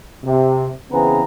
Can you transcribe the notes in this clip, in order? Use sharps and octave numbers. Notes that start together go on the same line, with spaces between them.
C3
C#3 E3 B3 C4 G#4 A#5